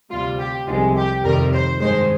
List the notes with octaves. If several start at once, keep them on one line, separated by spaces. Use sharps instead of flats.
D2 C3 G3 F4
G4
C2 C3 F3 G#3 F4
G4
F2 C3 D#3 G3 A#4
C5
G2 D#3 G#3 C5